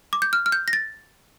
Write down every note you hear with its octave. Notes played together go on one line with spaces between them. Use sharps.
D6
G6
F6
F6
G6
A#6
A6